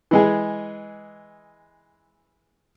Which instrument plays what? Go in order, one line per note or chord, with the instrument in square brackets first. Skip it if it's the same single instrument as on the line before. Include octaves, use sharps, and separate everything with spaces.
[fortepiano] E3 G#3 G#4